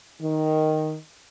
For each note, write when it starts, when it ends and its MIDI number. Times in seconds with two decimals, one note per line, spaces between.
0.21 0.94 51